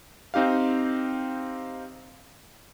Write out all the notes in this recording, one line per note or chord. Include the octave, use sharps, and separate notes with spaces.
C4 D#4 G4 F5